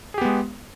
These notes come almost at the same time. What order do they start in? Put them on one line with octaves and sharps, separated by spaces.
G#4 G4 B3 G#3